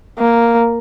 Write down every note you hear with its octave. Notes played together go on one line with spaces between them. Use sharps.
A#3